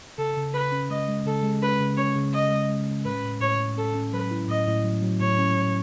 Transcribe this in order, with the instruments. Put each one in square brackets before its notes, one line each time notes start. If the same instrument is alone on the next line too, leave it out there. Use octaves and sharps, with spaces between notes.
[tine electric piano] C#3 [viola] A4
[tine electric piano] C#3
[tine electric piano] C#3 [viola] B4
[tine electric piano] C#4
[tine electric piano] G#3 [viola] D#5
[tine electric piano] G#3
[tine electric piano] C#3 [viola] A4
[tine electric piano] G#3
[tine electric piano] C#4 [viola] B4
[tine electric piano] C#3
[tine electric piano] C#4 [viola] C#5
[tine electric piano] C#3
[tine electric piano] C#4 [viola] D#5
[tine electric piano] G#3
G#3
C#4
[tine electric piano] A2 [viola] B4
[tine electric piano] A2
[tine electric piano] A2 [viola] C#5
[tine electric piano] A2
[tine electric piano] C#4 [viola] A4
[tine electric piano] C#4
[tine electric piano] F#3 [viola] B4
[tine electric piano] E4
[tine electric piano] A2 [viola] D#5
[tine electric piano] A2
F#3
F#3
[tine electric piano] A2 [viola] C#5
[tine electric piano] C#4
A2